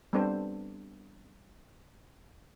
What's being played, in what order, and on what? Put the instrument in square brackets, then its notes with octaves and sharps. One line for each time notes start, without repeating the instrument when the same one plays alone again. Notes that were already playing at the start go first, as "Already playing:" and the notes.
[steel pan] G3 B3 C4 D4 A4 C5